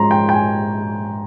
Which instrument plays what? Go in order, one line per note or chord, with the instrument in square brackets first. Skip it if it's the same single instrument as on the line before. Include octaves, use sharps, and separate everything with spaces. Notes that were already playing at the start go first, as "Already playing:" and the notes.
Already playing: [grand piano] G#2 F3 G#3 C#4 A#5 C6
G5
G5
G#5